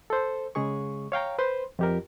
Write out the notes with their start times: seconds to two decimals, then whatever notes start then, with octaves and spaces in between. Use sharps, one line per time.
0.10 A4 C5
0.55 C#3 G#3 G#4 C#6
1.12 C#5 F5 G5 A#5
1.39 B4 C5 C6
1.79 F2 G4 A#4